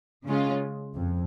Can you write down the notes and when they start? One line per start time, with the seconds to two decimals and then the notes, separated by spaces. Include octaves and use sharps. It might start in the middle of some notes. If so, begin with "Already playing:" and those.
0.26 C#3 G#3 C#4 F4
0.96 F2